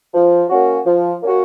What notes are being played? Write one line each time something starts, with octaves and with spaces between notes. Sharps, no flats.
F3
A#3 C#4 F#4
F3
A#3 C#4 F#4